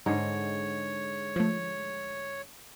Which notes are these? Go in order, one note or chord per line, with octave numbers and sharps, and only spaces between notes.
G#2 D3 G#3 D#4 C#5
F3 A3